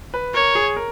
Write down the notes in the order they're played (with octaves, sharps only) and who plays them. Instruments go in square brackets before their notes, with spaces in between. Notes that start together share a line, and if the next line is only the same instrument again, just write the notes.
[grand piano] B4
[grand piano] A#4 [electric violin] C#5
[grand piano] G#4
A#4